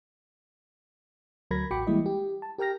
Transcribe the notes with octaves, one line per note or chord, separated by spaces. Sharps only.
D2 F#3 A#4 B5 G#6 A#6
A1 F#4 G5 B5 D6 C#7
E3 G3 G#3 A#3 E4 D#5
G4
A5
G4 A#4 G5 F6 A#6